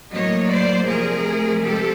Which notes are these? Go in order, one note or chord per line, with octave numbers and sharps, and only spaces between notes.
A2 F#3 A#3 C#5 D#5
C5 D5
C3 F3 A3 G#4 A#4
C3 F3 G#3 G4 A4